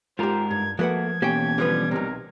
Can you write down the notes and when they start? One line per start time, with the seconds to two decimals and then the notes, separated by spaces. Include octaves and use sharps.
0.19 G#2 F4 G4 A#4 C5 A#5
0.51 G2 G#6
0.79 F3 A3 A#3 F#4 B4 F#5 G#6
1.22 B2 E3 A#3 C#4 G4 C#5 G5 G#5
1.58 D3 F3 G3 B4
1.91 B1 C3 A#4